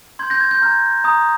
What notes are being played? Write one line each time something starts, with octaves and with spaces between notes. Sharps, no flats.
C6 G6 G#6
G6 A#6
G#6
G6
A#5 F6 G#6
A#5 D#6 G6